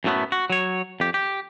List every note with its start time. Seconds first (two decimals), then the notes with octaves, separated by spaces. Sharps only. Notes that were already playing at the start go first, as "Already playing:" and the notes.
0.04 F#2 A2 F#3 A3 B3
0.32 F#4
0.50 F#3 C#5
1.00 F2 G4
1.14 G4